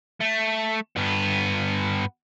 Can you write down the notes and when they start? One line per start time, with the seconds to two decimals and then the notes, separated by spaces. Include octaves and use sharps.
0.21 A3
0.97 G2 B3